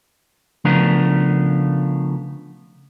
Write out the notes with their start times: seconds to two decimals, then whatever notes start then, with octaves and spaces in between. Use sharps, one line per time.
0.65 C#3 F3 A3 B3 D4 A#4